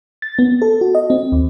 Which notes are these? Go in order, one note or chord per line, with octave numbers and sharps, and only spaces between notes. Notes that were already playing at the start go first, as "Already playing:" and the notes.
A6
B3
A4
F#4
D#5
C4
D#2